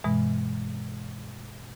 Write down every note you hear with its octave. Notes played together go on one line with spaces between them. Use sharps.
G2 B2 E3 G#3